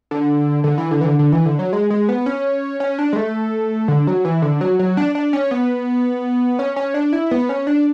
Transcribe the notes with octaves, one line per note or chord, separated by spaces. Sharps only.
D3
D3
E3
D3
E3
D3
D3
E3
D3
F#3
G#3
G#3
B3
C#4
C#4
D4
G#3
A3
D3
F#3
E3
D3
F#3
F#3
D4
D4
C#4
B3
C#4
C#4
D4
E4
B3
C#4
D4